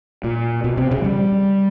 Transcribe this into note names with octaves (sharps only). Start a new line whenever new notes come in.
A#2
B2
C3
C#3
G3